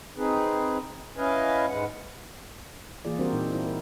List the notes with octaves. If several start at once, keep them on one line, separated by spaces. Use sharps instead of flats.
C4 D#4 G#4 B4
C#4 E4 B4 D#5 F5 G#5
G#2 G#3 B4 F#5
E3 A#3 F4 G#4 D5
G3 C4 D4 F#4 A#4 C5
A#2 D#4
E4
A#4